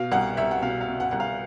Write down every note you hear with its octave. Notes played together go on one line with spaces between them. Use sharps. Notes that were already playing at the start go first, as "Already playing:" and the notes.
Already playing: B2 F5
C2 F#5
C2 E5
F#5
B2 F5
F5
B2
F#5
C2 F#5
F5